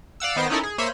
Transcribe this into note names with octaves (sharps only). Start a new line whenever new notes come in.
D5 F5 F#5 E6
D#3 B3 C5 A#6 D7
C#4 D#4 E4 A4 A#4
G#4
A#3 C5 C#5 E5 B5 D#7